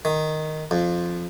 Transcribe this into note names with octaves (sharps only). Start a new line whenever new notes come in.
D#3
F2